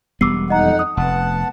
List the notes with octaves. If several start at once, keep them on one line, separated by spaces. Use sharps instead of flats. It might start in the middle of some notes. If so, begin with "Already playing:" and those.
E1 G3 B3 D6 E6 C7
F2 D#4 D#5 F#5 A#5
D#6
F1 B3 F#5 A5